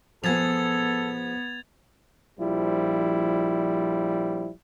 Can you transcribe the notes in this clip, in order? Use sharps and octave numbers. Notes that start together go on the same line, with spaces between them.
F3 B3 G#4 A4 G#6 A6 F7
A#1 F3 G3 E4